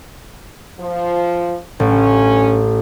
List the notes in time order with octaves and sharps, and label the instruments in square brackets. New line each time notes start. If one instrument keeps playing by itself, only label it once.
[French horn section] F3
[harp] A1 [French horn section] G2 C#4